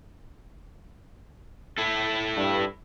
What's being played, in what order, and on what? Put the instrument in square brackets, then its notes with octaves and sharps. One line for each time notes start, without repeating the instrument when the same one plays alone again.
[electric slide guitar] E4 A4
[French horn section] G2